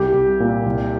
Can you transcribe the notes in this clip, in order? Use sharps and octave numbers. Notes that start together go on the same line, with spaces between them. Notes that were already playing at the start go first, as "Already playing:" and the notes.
Already playing: C2 G4
C2
A#2
C2